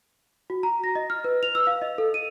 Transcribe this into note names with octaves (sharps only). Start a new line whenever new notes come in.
F#4
A#5
A#6
D#5
F6
B4
F7
E6
F5
D#5
A4
D#7